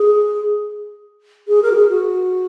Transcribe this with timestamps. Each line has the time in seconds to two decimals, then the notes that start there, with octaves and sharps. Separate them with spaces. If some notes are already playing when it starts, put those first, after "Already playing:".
Already playing: G#4
1.48 G#4
1.62 A#4
1.71 F#4
1.75 G#4
1.89 F#4